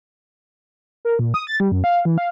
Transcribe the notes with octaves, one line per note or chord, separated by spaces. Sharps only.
A#4
A#2
D#6
A6
G3
F#2
F5
E3
F5